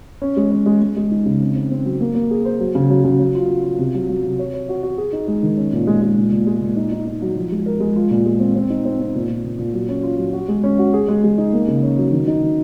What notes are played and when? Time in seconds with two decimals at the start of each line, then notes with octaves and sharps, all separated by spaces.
0.22 C#4
0.37 G#3
0.51 C#4
0.66 G#3
0.82 G#3
0.96 G#3
1.11 D#4
1.25 C#3
1.41 C4
1.55 C4
1.71 C4
1.85 F#3
2.01 A#3
2.15 A#3
2.31 G#4
2.45 C5
2.60 F#3
2.75 C#3
2.90 F#3
3.04 C#3
3.19 F#3
3.35 F4
3.49 F4
3.63 F4
3.78 C3
3.94 F#3
4.09 F#3
4.24 C3
4.39 C#5
4.54 C#5
4.69 F#4
4.83 F#4
4.98 G#4
5.13 D#4
5.28 G#3
5.43 D#3
5.57 C#4
5.73 A#2
5.87 G#3
6.02 G#3
6.17 A#2
6.32 A#2
6.47 G#3
6.61 A#2
6.76 D#4
6.92 D#4
7.06 D#4
7.22 F#3
7.36 F3
7.51 G#3
7.66 A#4
7.80 G#3
7.96 F4
8.11 A#2
8.25 G#3
8.40 C4
8.56 C4
8.70 D#4
8.85 C4
9.00 C4
9.15 A#2
9.29 A#2
9.44 A#2
9.59 A#2
9.73 F#3
9.89 C#4
10.03 F4
10.18 F#3
10.33 F#4
10.48 G#3
10.63 C#4
10.78 F#4
10.94 G#4
11.08 G#3
11.23 G#3
11.38 D#4
11.53 A#3
11.68 C#3
11.83 C#4
11.98 F#3
12.12 D#3
12.27 D#4
12.42 D#3